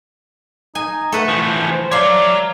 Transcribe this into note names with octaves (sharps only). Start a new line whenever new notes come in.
D#4 G#5
A3 A4 B4 F#5
E3 F3
C5
C#5 D5 E5 F5 A#5